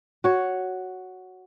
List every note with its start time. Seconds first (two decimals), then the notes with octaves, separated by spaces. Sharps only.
0.24 F#4 C#5